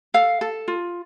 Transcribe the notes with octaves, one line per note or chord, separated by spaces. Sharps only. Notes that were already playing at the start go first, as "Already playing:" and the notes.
A4 F5
A4
F4